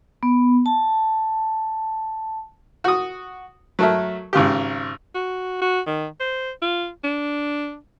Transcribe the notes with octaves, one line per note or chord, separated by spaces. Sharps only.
B3
A5
F#4 D#6
F#3 A3 A4 A#4 E5
G#1 C#3 F4 G4
F#4
F#4
D#3
C5
F4
D4